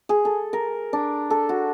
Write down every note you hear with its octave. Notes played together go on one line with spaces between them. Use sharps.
G#4
A4
A#4
D4
A4
F#4